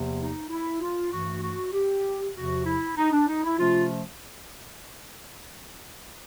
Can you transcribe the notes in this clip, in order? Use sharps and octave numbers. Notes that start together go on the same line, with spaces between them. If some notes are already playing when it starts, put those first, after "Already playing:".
Already playing: E2 C3 F3 A#3
D#4
E4
F4
G2 E3 A3 F#4
F#4
G4
E2 C3 F3 F#4
E4
D#4
D4
D#4
E4
C3 F3 A3 C#4 F4